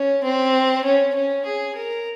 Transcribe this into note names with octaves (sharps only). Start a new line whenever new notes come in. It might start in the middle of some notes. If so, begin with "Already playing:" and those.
Already playing: C#4
C4
C#4
C#4
G#4
A#4